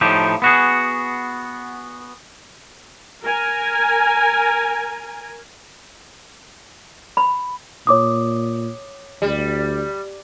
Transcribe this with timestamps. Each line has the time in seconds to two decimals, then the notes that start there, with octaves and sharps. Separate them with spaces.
0.01 A2 F3 D#4 G4
0.42 B3 F#4 G#4
3.23 A#4 G#5
7.17 B5
7.87 A#2 C#5 D6 D#6
9.22 D2 G3